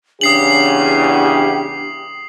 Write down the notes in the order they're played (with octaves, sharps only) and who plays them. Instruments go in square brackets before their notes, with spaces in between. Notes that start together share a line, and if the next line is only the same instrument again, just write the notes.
[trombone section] E2 C#3 [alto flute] D4 [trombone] G4 [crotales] D#6 C7 F#7